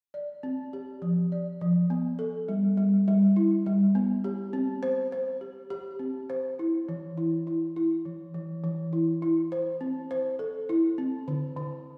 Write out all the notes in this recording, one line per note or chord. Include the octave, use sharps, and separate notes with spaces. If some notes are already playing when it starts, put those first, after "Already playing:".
D5
C4
G4
F3
D5
F3
B3
A4
G3
G3
G3
E4
G3
B3
G4
C4
C5
C5
G4
G4
C4
C5
E4
E3
E4
E4
E4
E3
E3
E3
E4
E4
C5
C4
C5
A4
E4
C4
D3
D3